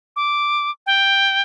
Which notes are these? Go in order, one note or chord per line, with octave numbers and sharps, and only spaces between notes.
D6
G5